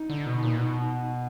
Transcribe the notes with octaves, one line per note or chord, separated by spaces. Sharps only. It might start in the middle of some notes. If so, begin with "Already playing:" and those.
Already playing: D#4
D3
B2
A#2
B2